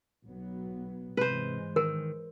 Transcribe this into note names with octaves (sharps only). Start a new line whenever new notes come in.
B1 F#3 B3
G#2 C3 E3 G#3 B4 C5
D#3 A#4